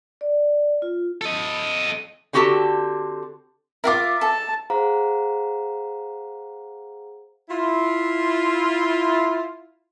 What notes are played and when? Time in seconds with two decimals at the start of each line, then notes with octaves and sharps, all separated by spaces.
0.21 D5
0.82 F4
1.21 A4 D#5
2.33 D3 C4 F#4 G4 A4 A5
3.84 F4 F#4 A#4 E5 D6
4.21 A4 A5
4.70 G#4 C5 F5 F#5 A#5
7.50 E4 F4